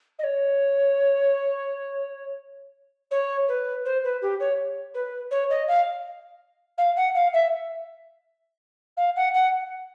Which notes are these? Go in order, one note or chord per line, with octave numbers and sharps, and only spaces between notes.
D#5
C#5
C#5
B4
C5
B4
G4
C#5
B4
C#5
D#5
F5
F5
F#5
F5
E5
F5
F#5
F#5